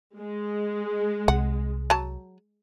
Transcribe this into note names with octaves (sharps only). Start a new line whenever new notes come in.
G#3
C2 F#5
F#3 A5